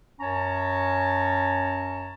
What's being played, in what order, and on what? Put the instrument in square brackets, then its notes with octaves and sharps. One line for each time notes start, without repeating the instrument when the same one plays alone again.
[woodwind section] F#2 C#4 C#5 A5 A#5